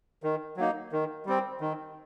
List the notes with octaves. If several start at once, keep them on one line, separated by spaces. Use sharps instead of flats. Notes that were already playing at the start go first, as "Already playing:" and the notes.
D#3
F#3 A#3 D#4
D#3
G3 C4
D#3